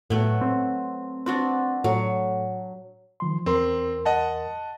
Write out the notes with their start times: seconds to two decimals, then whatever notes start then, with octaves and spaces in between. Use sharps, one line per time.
0.10 A2 F#3 A3 B3
0.41 C4
1.26 C4 D4 F#4 B4
1.84 A2 F#3
3.20 D#3 F3 C6
3.46 E2 C4 A#4 C6
4.05 D#5 F#5 A5